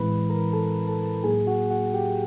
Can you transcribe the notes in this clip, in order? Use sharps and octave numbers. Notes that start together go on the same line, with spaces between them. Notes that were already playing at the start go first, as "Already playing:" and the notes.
Already playing: A2 E3 G#3 C4 E4 B4 B5
A#4 A#5
A4 A5
A4 A5
A2 F#3 A#3 D#4 G#4 G#5
F#4 F#5
F#4 F#5
G4 G5